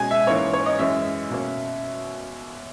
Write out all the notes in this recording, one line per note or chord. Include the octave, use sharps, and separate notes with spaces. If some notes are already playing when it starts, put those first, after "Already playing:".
Already playing: B2 G#3 C#4 G#5
E5
G#2 E3 A#3 C#4 C#5
C#5
D#5
F#2 E3 G#3 C#4 E5
B2 A#3 C#4